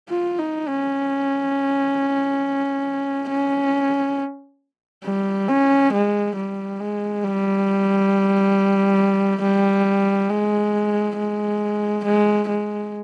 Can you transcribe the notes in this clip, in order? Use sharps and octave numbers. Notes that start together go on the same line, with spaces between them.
F4
D#4
C#4
C#4
G3
C#4
G#3
G3
G#3
G3
G3
G#3
G#3
G#3
G#3